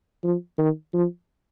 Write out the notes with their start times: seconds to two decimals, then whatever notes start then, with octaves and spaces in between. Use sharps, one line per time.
0.24 F3
0.59 D#3
0.94 F3